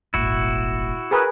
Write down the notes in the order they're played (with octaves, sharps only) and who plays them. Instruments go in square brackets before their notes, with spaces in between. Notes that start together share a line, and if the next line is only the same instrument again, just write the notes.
[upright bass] D#1 G#1 [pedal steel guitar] E4 F#4
[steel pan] G#4 A#4 B4